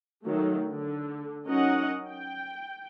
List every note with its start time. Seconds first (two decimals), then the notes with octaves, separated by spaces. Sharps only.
0.25 D#3 F#3 A3
0.68 D3
1.46 F#3 C#4 D#4 A#4 D#5 F#5
2.07 G5